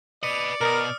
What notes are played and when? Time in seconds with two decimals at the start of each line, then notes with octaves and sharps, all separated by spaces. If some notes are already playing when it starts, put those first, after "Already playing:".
0.23 B4 D5 D#5 C#7
0.61 B2 A#4 D#6 F6